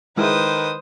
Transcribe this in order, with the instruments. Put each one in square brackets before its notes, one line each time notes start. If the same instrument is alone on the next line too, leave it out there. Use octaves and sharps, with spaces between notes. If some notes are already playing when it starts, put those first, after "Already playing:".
[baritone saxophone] D#3 [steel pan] G#3 E4 [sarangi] B4 [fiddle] C5 D#6